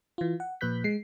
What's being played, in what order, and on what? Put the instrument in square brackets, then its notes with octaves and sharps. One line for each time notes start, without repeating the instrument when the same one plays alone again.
[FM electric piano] E3 F4
F#5
A#2 F3 B4 F#6 G6 B6
G#3 C7